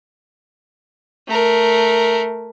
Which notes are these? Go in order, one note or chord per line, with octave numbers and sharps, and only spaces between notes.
A3 A#4